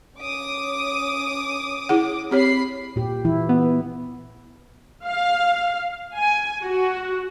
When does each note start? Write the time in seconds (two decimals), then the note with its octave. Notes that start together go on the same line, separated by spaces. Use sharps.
0.18 C#4 D6 D#6
1.89 E4 G#4 F#5
2.31 C4 G4 C#5 B5 C7
2.96 A#2 G4
3.25 E3 E4
3.49 B3
5.04 F5
6.15 G#5
6.61 F#4